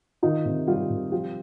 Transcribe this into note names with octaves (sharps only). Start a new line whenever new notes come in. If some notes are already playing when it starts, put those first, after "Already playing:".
D#3 D#4 F4
C3
G3 F4 G4
C3
F3 F4 G4